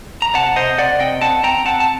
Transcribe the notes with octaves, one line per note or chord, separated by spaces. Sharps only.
A#5
C3 F#5 A5
C3 C5 D#5
C3 D5 F#5
C4 D#5 G5
C4 F#5 A5
C4 G5 A#5
C4 F#5 A5
A5